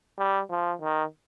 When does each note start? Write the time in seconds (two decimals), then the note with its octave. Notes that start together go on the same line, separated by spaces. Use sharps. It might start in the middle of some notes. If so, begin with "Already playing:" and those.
0.18 G3
0.50 F3
0.81 D#3